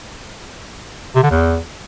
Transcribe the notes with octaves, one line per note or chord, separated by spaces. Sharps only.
C3
D3
E2